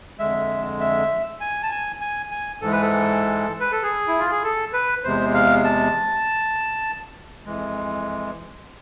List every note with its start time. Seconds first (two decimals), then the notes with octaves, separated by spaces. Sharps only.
0.19 F2 D3 G#3 E5
0.80 E5
1.41 G#5
1.63 A5
1.71 G#5
2.01 G#5
2.31 G#5
2.61 G#2 E3 G#3 A4
2.71 B4
2.82 A4
3.60 B4
3.72 A4
3.83 G#4
4.08 E4
4.19 F4
4.31 G#4
4.44 A4
4.73 B4
5.04 E2 C3 G#3 C5
5.34 F5
5.64 A5
7.46 F2 E3 G#3